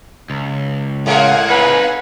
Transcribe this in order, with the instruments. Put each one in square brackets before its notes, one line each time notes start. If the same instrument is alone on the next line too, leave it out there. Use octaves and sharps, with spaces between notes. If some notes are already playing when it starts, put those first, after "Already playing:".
[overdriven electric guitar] C#2
[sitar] A2 G#3 A#3 [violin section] F5 F#5 G#5
[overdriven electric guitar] C4 D#4 [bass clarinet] B4